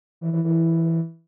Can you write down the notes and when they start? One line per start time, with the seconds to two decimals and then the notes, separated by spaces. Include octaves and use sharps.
0.21 E3
0.33 E3
0.44 E3